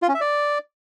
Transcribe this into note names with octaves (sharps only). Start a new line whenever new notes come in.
F4
C#4
E5
D5